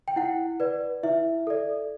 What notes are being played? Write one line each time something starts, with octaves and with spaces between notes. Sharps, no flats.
G5
E4 F#5
B4 D5
E4 E5
A4 D5